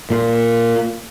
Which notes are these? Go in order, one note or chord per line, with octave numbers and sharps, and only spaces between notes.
A#2